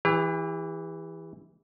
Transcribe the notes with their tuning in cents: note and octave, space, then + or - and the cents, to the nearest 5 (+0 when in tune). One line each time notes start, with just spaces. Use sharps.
E3 +0 G4 +45